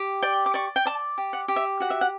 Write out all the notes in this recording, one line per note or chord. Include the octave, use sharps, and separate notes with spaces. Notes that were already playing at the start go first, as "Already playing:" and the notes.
Already playing: G4
D5 G5
D6
D5 C#6
G5
D5 A5
G4
F#5
G4
E5
F#4 F#5
E5
F#5